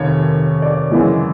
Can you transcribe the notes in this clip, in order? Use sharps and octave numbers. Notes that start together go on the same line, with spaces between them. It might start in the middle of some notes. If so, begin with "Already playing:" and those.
Already playing: F1 D#2 D#3 C#5
D5
F#2 C#3 E3 G#3